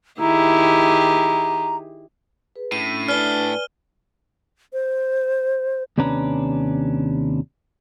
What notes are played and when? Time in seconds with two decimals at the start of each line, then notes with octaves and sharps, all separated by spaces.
0.20 D#3 E4 G4 G#4 A#5
2.56 G#4 B4
2.72 A2 C#4 D4 A5 D#7
3.08 D4 B4 D5 G#5 F6 G7
4.73 C5
5.98 D#2 C3 C#4 D4 B4 A#5